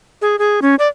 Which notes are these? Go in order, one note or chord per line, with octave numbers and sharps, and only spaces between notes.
G#4
G#4
C#4
D5